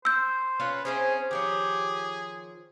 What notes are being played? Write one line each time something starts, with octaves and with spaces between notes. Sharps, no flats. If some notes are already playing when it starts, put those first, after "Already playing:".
C5 E6 G6
C#4 F4 B4 C#5
C4 C#4 E4 G#4 C5
D#3 F3 G4 G#4 C#5